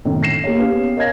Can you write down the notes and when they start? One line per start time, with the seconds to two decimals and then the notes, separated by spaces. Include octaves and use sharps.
0.05 F#2 A2 C3 D#3
0.23 A#6 C7 E7
0.44 A#3 G4 C#5
0.58 B3 C#4 G4 G#4 B4 F5
0.97 A#4 C#5 D#5 F5 G#6 A#6